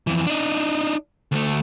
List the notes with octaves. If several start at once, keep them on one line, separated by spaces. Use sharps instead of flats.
F2 E3
D4 D#4
D2 A3